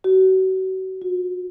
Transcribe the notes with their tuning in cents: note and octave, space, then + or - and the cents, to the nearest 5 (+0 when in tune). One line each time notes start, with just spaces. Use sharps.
F#4 +35
F#4 -40